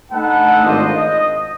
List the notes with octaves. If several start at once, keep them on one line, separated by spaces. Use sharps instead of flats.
A3 D4 D#4 A4 B4 F#5
G#1 D4 F4 C5 D5 D#5
D#5